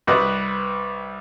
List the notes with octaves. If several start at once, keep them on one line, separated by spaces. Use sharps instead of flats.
C2 G3 B4 D#5